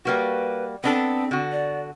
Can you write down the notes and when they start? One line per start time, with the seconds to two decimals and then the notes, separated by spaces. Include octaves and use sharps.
0.05 G3 A#3 F#4 B4
0.84 B3 C4 D4 A4
1.31 D3 F#4
1.52 D5